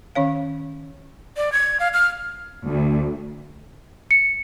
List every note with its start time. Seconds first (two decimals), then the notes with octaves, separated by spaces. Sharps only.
0.15 D#3 C#4 C#5 F5
1.37 D5
1.52 G#6
1.80 F5
1.93 F6
2.67 D2
4.11 C#7